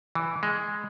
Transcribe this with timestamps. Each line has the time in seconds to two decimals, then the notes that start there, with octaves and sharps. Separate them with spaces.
0.15 E3
0.43 G#3